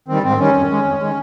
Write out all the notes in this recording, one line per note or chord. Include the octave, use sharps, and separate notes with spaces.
D#3 G3 C4
G#2 C4
D#3 G3 C#4
F2
D#3 G#3
F2
D#3 G#3